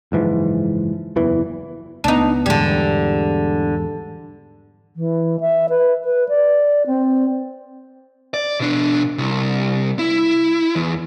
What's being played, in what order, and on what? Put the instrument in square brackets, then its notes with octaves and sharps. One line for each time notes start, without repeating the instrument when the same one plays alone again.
[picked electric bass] F#1 G#2 E3 F3
F#1 E2 E3
[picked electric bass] C#2 B3 [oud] D4 D#4
[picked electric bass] E2 G#2 [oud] D3 G3
[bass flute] E3
E5
B4
B4
D5
C4
[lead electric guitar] D5
B2 D4
C2
E4
E2